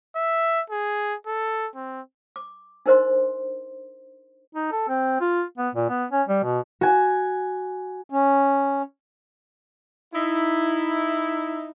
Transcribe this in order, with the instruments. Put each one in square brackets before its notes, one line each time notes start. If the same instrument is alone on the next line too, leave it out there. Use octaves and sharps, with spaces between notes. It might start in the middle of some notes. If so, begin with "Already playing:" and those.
[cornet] E5
G#4
A4
C4
[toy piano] D6
D4 D#4 A#4 C5 D#5 C6
[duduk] D#4
A4
C4
F4
B3
A#2
B3
C#4
G3
B2
[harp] F#4 G#5
[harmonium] C#4
[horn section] D#4 E4